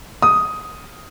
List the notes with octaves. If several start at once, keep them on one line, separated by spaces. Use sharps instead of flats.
D#6